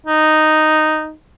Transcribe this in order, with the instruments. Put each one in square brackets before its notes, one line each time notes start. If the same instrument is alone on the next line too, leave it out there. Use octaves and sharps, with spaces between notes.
[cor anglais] D#4